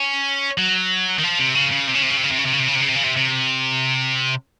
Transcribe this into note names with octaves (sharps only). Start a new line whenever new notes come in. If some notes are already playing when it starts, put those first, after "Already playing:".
Already playing: C#4
F#3
D#3
F3
C3
C#3
C#3
C3
C#3
C3
C#3
C3
C#3
C3
C#3
C3
C#3
C3
C#3
C3
C#3
C3
C#3
C3
C3